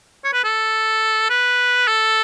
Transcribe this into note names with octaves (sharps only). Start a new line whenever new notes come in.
C#5
B4
A4
B4
A4